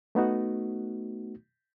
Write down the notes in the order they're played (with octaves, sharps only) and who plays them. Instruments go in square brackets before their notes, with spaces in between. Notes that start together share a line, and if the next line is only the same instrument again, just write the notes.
[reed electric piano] A3 B3 D#4 F#4